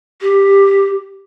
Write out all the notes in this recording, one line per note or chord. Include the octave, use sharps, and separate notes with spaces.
G4